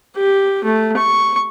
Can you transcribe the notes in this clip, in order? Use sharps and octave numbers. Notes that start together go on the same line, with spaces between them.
G4
A3
C#6